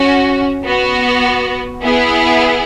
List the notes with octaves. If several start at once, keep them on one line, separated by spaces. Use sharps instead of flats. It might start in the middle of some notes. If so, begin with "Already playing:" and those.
Already playing: C#4 F#4
B3 F#4
B3 E4 G#4